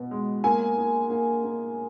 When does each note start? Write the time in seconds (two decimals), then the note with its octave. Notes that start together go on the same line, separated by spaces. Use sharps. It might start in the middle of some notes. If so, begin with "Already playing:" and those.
Already playing: B2 B3
0.11 G#3
0.44 A#3 G#5
0.77 A#3
1.10 A#3
1.44 A#3